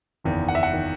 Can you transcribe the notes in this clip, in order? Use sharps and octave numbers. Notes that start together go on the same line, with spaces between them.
F#1 E2 D#3
F#5
E5
F#5
D#3